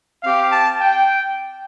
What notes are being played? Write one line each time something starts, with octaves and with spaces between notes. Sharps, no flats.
C4 G4 F5
A5
G5